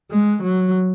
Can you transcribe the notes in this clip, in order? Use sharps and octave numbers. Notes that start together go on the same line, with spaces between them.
G#3
F#3